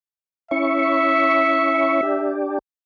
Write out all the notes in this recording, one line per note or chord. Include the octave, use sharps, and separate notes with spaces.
C#4 E4 E5 C#6
D4 G4